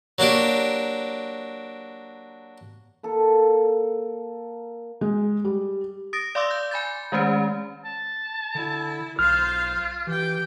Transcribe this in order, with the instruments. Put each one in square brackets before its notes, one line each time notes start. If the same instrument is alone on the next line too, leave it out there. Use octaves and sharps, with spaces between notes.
[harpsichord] F#3 A#3 D4 G4
[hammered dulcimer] A#3 A4
[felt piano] G#3
G3
[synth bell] D#6 A6 A#6 D7
D5 F5 C6 D6 E6
G6
G#5 B5 G6 A6
D#3 G#3 A3 C#4 C5
[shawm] A5
[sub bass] D3 [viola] E4
[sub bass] B1 [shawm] F4 [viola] C5 F5 [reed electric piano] F6
[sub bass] E3 [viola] G4 G5